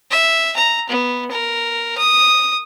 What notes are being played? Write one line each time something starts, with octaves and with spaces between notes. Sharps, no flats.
E5
A#5
B3
A#4
D#6